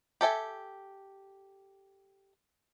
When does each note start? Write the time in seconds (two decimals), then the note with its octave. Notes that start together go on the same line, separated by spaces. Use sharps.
0.21 G4 A4 E5 G#5